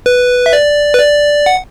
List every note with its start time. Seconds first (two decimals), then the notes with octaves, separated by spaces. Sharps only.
0.06 B4
0.46 E5
0.53 D5
0.94 B4
1.00 D5
1.46 F#5